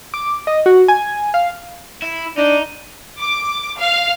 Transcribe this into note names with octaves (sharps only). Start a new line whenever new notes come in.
D6
D#5
F#4
G#5
F5
E4
D4 D#4
D6
F5